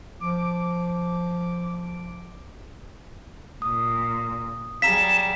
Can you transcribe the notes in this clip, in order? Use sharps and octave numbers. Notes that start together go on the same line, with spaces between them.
F3 D6
A#2 D#6
F#3 G3 G#4 F5 A#5 B6 E7